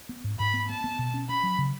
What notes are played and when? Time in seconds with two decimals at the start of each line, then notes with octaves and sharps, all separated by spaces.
0.09 B3
0.24 G#2
0.39 G#2 B5
0.54 B3
0.69 B3 A5
0.84 B3
0.99 B2
1.14 C#4
1.29 C#4 B5
1.43 F#3
1.58 C#3